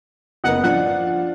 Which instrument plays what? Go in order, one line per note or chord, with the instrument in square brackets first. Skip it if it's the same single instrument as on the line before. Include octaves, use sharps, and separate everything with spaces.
[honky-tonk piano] F#1 B3 A#4 [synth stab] D#5 F#5
[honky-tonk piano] F3 D4 [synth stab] F#5